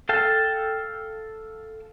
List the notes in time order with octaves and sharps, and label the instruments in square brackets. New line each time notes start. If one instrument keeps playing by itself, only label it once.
[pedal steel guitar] A4 F5 G5 A5